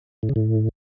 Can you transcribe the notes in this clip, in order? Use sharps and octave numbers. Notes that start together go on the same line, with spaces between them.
A2
C#3
A2